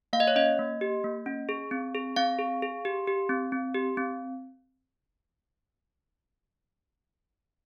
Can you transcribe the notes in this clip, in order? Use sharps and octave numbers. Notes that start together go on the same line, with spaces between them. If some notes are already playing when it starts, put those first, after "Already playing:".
A#3 F5
D#5
C#5
C#4 D#5
A#3
G4
A#3
C#4
G#4
C4
G#4
C4 F5
G#4
G#4
G4
G4
C4
C4
G4
C4